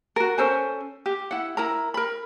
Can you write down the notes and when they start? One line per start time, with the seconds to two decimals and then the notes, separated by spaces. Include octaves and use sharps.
0.16 F#4 A#4
0.38 C#4 A4 C5 G#5
1.06 G4
1.31 E4 F#5
1.57 E4 A#4 A#5
1.94 A#4 B5